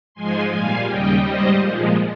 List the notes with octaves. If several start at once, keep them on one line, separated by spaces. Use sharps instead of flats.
G#2 F3 G#3 G#5 C6
A#2 G3 F5 G#5
D#2 C#3 G3 D#5 G5
G#2 G3 C5 D#5
A#2 F3 G#3